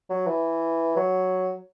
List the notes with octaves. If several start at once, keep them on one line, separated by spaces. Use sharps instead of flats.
F#3
E3
F#3